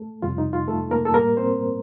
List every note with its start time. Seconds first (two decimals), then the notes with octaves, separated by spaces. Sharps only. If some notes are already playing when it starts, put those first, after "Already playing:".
Already playing: A3 A4
0.22 F2 C3 G3 F4
0.38 D#4
0.53 F4
0.68 A3 A4
0.91 A#3 A#4
1.05 A4
1.14 A2 G3 A#3 A#4
1.37 C4 C5